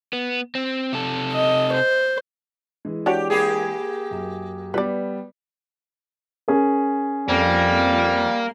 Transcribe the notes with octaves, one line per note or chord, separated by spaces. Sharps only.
B3
C4
C3 A4
D#5
C5
E3 G#3
D4 F#4 G4 C#5
A#3 G4 G#4
F#2
G3 B3 B4 D5
C#4 G#4 A#4
F2 G3 A#3